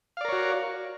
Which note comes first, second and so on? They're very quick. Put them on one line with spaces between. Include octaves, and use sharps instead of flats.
F5 D5 A#4 C#5 F#4